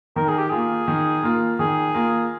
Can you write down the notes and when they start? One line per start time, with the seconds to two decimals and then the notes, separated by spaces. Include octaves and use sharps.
0.16 D#3 A#4
0.28 G#4
0.38 G4
0.50 A#3 F4 G#4
0.88 D#3
1.23 A#3 F4
1.59 D#3 G#4
1.95 A#3 F4